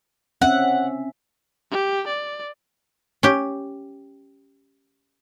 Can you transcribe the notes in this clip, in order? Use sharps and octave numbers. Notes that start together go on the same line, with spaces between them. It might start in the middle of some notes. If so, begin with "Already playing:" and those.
C4 C#4 E5 F#5
G4
D5
C#4 G4